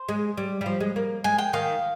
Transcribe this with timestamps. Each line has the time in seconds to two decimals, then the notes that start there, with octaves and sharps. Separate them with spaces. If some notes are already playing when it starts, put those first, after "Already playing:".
Already playing: C5
0.09 G#3
0.37 G3
0.61 G3
0.66 F3
0.80 G#3
0.96 A#3
1.24 G#3 G#5
1.38 G5
1.53 D#3 F5